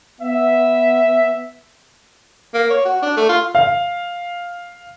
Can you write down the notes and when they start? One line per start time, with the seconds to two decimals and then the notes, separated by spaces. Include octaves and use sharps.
0.20 B3 E5
2.54 A#3
2.70 C#5
2.85 F#4
3.02 D4
3.17 A3
3.29 F4
3.55 F5